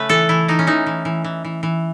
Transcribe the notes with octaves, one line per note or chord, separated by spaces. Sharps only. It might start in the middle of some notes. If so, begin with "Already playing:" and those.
Already playing: C#3 A3 C#4 B4
E3 A4
E3 E4
E3 D#4
C#4
E3 D#4
E3
E3
E3
E3
E3